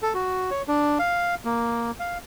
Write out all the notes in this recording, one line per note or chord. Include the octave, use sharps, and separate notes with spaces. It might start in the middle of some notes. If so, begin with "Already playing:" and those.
A4
F#4
C#5
D4
F5
A#3
F5